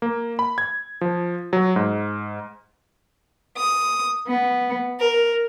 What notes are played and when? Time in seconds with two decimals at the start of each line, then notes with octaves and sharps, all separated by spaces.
0.02 A#3
0.39 B5
0.58 G#6
1.01 F3
1.53 F#3
1.76 G#2
3.57 D#6
4.28 B3
5.00 A#4